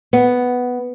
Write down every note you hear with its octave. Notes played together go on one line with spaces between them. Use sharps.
B3